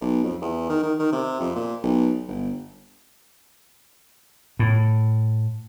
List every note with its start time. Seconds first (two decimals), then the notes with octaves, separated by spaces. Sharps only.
0.01 B1
0.23 F2
0.42 E2
0.69 D#3
0.83 D#3
0.99 D#3
1.13 C3
1.40 F2
1.56 A#2
1.83 B1
2.28 G1
4.59 A2